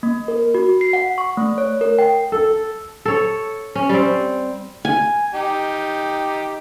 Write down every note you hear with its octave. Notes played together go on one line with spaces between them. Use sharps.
A#3
A#4
F#4
C7
F#5
C#6
A3
C#5
A#4
G5
A4
A4 C#5
C#4
G3 C4
G#5
D#4 G4